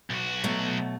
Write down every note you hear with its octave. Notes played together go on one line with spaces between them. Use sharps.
B1 F#4
B2 F#3 A3